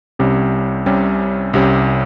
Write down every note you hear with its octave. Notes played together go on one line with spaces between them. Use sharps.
C2 C3 G3 C#4
C2 C3 G3 C#4
C2 C3 G3 C#4